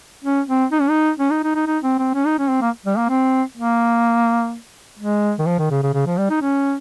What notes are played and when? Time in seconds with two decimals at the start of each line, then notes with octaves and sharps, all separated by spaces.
0.25 C#4
0.48 C4
0.72 D#4
0.81 C#4
0.90 D#4
1.19 C#4
1.31 D#4
1.44 D#4
1.55 D#4
1.67 D#4
1.83 C4
1.99 C4
2.15 C#4
2.26 D#4
2.39 C#4
2.50 C4
2.62 A#3
2.86 G3
2.98 A#3
3.09 C4
3.57 A#3
4.99 G#3
5.39 D#3
5.47 F3
5.59 D#3
5.71 C#3
5.83 C#3
5.94 C#3
6.07 F3
6.18 G3
6.30 D#4
6.42 C#4